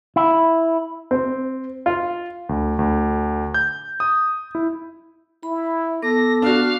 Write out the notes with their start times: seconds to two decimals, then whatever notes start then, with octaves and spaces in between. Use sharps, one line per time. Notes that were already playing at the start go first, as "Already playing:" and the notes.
0.16 E4
1.11 C4
1.86 F4
2.49 D2
2.79 D2
3.54 G6
4.00 D#6
4.55 E4
5.43 E4 B5
6.02 B3 A4 D6 A#6
6.42 D4 F#4 F5